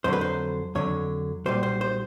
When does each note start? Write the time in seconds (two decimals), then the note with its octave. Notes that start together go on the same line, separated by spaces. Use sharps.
0.04 F2 D3 F#3 C5
0.13 B4
0.21 C5
0.75 F2 D3 F#3 C#5
1.46 B1 A#2 G3 C5
1.63 C5
1.81 C5